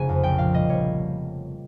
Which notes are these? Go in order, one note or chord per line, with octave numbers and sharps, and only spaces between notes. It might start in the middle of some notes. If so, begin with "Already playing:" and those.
Already playing: F1 C#3 G#5
F2
A#1 G5
A#2 F5
G3 D#5
G3 C#5